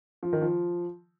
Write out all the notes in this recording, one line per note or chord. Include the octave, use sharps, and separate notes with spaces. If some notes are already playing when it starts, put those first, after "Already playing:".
F3
D#3
F3